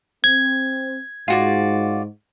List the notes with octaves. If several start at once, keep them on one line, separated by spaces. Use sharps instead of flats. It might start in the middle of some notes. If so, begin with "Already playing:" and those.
C4 G#6
G#2 F4 F#4 D5